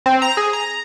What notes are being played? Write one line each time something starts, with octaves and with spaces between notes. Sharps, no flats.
C4
A#5
G#4
A#5